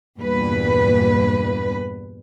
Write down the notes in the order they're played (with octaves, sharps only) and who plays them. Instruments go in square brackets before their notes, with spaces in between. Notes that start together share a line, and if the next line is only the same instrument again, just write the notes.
[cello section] E2 G2 A#2 B4